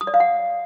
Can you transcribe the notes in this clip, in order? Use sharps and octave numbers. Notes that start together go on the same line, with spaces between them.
D#6
D5
F5
F#5